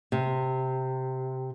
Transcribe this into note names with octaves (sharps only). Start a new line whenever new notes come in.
C3